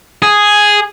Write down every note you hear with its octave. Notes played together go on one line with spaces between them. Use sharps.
G#4